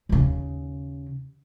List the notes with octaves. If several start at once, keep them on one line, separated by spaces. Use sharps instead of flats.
D#2 C#3